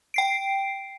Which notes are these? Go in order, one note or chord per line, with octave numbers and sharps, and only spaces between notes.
G5 C7 D7